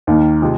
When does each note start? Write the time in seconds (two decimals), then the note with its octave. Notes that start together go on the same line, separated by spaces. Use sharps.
0.07 D#2 D#3 A#3
0.42 C3 G#3 F4 G#4